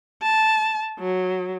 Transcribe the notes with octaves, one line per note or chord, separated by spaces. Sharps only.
A5
F#3